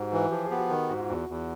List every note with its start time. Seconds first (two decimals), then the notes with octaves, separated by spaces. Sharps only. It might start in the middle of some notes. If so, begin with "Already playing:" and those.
Already playing: G#2 F#4 G4
0.12 E3 F#4
0.31 F3 G4
0.45 G#4
0.51 B3 G4
0.57 F#4
0.70 D#3
0.90 G#2 F#4
1.00 F4
1.09 E2 F#4
1.29 E2